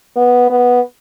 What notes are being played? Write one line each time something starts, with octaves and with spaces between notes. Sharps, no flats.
B3
B3